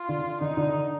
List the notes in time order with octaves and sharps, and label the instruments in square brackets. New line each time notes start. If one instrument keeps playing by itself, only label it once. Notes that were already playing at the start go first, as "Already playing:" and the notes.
Already playing: [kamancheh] F4
[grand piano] D3
[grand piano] D3 [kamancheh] D#4
[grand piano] D3